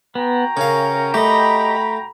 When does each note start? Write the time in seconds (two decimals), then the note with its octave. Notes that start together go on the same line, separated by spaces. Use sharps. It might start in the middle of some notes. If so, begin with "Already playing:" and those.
0.15 B3 F#4 G5 A#5
0.57 C#3 C#4 A#4 F5
1.14 A3 G4 D#5 B5